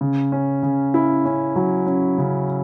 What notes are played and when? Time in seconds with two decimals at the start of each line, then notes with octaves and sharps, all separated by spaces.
0.01 C#3
0.32 C#4
0.63 C#3
0.94 E4
1.25 C#4
1.56 F#3
1.86 C#4
2.18 C#3